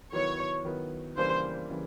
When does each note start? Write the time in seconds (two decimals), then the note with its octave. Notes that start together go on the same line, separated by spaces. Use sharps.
0.12 D#3 F#3 B3 E4 C#5
0.65 D#3 F#3 B3 E4
1.17 C#3 E3 G3 A#3 D4 C5
1.70 C#3 E3 G3